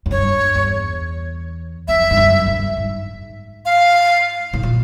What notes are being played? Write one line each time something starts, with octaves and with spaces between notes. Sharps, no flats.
F#2
G2 C#5
E2
F2 E5
G2
F#2
G2
G#2
F5
A2
A#2